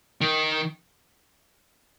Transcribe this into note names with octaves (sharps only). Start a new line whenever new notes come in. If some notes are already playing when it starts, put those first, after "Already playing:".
D#3